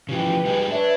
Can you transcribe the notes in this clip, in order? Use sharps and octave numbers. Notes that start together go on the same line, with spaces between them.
C#3 E3 F3 G4 B4
G3 D#4 G#4
D4 B4 C#5 E5